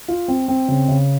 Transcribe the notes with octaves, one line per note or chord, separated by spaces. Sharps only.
F4
C4
C4
C#3
C#3